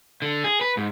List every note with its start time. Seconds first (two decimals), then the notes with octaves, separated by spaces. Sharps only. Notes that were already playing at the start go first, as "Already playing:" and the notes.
0.22 D3
0.44 G#4
0.61 B4
0.77 G#2